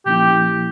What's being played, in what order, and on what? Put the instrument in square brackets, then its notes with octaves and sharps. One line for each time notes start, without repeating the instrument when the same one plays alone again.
[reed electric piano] A#2 F3 A#3 C#4 E4 [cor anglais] G4